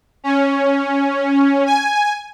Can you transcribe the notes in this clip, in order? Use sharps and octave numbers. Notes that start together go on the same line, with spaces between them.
C#4
G#5